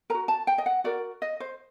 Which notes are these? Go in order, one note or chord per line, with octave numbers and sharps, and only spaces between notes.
F#4 A#4 A#5
A5
G5
D#5
F#5
F#4 A#4 D5
D#5
C5